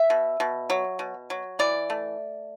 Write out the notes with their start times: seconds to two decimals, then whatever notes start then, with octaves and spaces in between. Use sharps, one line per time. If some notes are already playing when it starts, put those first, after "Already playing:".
Already playing: E5
0.10 B2
0.40 B2
0.70 F#3
0.99 B2
1.30 F#3
1.59 E3 D5
1.90 A3